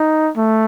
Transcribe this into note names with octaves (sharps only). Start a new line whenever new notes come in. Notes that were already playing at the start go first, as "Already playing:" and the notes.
Already playing: D#4
A3